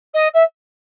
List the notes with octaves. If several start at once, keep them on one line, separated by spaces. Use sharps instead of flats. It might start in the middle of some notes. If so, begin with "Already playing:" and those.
D#5
E5